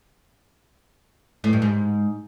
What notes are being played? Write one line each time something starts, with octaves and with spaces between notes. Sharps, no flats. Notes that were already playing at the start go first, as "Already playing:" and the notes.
A2
G2
G#2